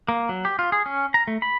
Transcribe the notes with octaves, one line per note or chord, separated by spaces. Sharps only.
A#3
F#3
G4
F4
G#4
C#4
A#5
A3
B5